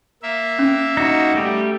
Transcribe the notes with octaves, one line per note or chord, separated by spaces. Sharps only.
A#3 E5
C#4
D#4 F#4
G3 A3 G4